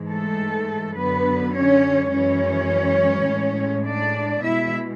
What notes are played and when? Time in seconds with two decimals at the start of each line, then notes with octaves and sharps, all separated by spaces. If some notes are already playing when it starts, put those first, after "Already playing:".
Already playing: G#2 E3 G#3
0.09 A3 A4
0.97 F#2 D3 F#3 B3 B4
1.54 C#4 C#5
2.13 F#2 E3 G#3 C#4 C#5
3.28 A2 G#3
3.86 D4 D5
4.44 B2 G#3 E4 E5